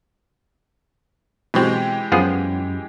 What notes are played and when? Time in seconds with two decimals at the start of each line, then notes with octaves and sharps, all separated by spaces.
1.54 B2 E3 G#3 C4 G4
2.12 F#2 F3 B3 G#4